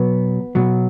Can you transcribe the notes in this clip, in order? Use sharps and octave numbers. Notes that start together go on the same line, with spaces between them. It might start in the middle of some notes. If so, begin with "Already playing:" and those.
Already playing: B2 F#3 B3
B2 F#3